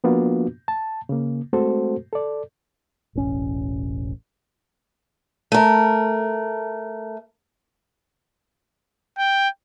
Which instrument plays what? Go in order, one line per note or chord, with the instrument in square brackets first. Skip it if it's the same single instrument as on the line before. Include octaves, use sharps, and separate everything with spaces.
[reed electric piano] F3 A#3 B3 D4 F4 F#4
A5
C#3 A#3
G#3 A3 C4 F#4 A4 C5
A4 D5
[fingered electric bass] E1 A1 C#4
[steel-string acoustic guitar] A3 A#4
[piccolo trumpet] G5